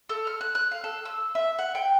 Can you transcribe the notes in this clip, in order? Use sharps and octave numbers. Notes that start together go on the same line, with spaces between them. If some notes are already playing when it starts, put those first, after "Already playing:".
A4
F6
F#6
F#6
F5
A4
E6
E5
F#5
G5